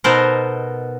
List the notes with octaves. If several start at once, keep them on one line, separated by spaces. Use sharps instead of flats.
B2 B3 D#4 A4 A#4 C5